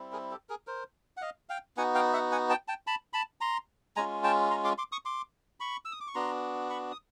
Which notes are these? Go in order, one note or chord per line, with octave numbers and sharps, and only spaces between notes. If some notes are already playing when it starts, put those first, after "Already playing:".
Already playing: G3 C4 E4
G#4 A#4
G4 A4
G#4 A#4
A#4 C5
F#5
D#5 F5
F5 G5
B3 D#4 F#4 F#5 G#5
F5 G5
E5 F#5
F#5 G#5
G5 A5
G5 A5
A5 B5
A5 B5
A#5 C6
G#3 C#4 F4 G#5 A#5
G5 A5
A#5 C6
C6 D6
C6 D6
C#6 D#6
C6 D6
B5 C#6
E6
D#6
D6
C#6
B3 D4 F#4 A#5 C6
B5 C#6
D#6